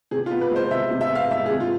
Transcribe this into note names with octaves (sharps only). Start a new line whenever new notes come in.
C3 G#4
F4
B3
B4
G#3 C5
C3 E5
C3
E5
B3 F5
G#3 E5
G#4
C3
F4